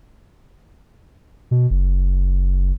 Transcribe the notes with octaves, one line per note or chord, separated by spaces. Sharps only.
B2
F#1